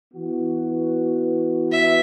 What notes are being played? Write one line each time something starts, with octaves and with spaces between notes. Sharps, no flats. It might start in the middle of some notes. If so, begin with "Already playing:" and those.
E3 B3 F#4
E5